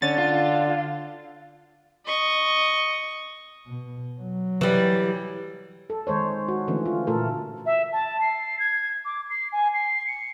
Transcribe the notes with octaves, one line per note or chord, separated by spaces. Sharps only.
D3 C#4 A6
F4
D#5 C#6
B2
F#3
E3 G3
A4
D#3 G#3 C5 C#5
F#4
D3 E3 A3 C#4
F4
A#2 A3 F4 A4 A#4
E5
A5
C7
G#6
D6
C7
G#5
C7
C#7